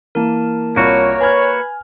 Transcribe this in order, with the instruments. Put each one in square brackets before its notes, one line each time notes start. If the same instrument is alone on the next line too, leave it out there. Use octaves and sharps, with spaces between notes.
[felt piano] E3 A#3 [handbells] A#4 A5
[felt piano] C2 F4 B5 [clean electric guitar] A#3 F#4 [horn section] C#5
[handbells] B4 B5 G#6 [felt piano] G#5 F6